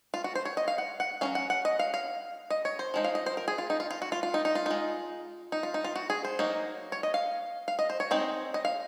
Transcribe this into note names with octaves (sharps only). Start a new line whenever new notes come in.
F4
F#4
C5
C#5
D#5
F5
F#5
F#5
F#3 A#3 C#4 F5
F#5
F#5
D#5
F5
F5
D#5
C#5
C5
F3 G#3 D#4
F5
D#5
C5
A#4
G#4
F4
D#4
F4
F4
F#4
F4
F4
D#4
D#4
F4
G#3 D#4
D#4
F4
D#4
F4
F#4
G#4
C5
F#3 A#3 D#4
C#5
D#5
F5
F5
D#5
C5
C#5
G#3 C4 D#4
D#5
F5